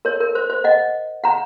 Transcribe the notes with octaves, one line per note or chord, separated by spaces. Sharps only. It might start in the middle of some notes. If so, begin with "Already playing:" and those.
A#4 C#5
A#4
C5
C5
D#5 F#5
F#5 A#5